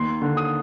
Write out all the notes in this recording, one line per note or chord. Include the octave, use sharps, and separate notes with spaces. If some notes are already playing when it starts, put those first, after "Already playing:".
Already playing: D#2 C6
D3
D#6